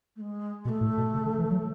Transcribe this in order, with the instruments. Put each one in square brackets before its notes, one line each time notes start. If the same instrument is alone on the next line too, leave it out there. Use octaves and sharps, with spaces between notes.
[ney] A3
G#3
[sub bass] B2 [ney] B3
[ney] A3
[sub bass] A2
B2
C#3
D3
E3
F#3